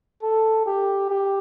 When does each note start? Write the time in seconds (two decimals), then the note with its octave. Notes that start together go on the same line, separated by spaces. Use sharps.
0.23 A4
0.66 G4
1.10 G4